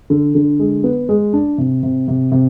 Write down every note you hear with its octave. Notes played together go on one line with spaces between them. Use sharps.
D3
D3
G#3
B3
G#3
D4
C3
C3
C3
C3